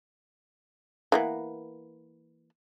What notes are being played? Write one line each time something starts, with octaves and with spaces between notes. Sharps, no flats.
E3 A#3 B3